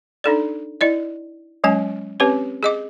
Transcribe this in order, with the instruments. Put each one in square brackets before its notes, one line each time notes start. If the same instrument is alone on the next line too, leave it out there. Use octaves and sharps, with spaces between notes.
[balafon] D4 D#4 A4 D5
E4 D5 D#5
F#3 G#3 C#4 G#5
C4 C#4 G4 B4 C#5
G#4 D#5 D6